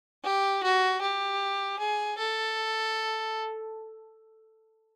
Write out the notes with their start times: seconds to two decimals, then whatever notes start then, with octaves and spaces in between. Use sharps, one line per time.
0.24 G4
0.63 F#4
1.02 G4
1.79 G#4
2.18 A4